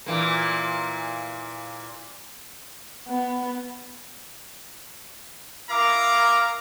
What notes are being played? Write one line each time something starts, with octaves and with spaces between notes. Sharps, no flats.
A#2 E3 A#3
B3
E4 A#4 F5 A#5 D6